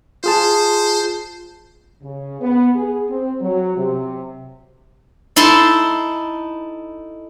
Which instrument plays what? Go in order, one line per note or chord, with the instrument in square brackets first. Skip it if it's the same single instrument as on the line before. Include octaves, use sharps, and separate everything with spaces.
[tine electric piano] F4 G#4 A5 [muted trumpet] C5
[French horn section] C#3
B3
G#4
C4
F#3
C3
[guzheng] D#4 E4 A4 A5 C6